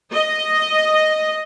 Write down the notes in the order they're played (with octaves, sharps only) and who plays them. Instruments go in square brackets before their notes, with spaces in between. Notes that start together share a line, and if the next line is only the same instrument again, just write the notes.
[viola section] D#5